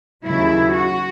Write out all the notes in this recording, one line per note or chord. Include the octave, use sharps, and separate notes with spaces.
D#2 C#3 F#3 E4
F#4